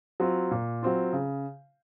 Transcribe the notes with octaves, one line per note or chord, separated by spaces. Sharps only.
F#3 C4 F4
A#2
F#3 C4 F4
C#3